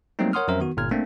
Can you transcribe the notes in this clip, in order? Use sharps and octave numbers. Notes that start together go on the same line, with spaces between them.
F#3 G3 A3 A#3 C4 D#4
A#4 C#5 F#5 C6 D#6 F6
F2 F#3 C#4 A#4 C5 E5
D#3 B3 F#4
G1 A#2 F6 G#6
A3 A#3 C4 D4